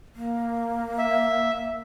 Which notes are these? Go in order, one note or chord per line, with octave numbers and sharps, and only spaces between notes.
A#3
E5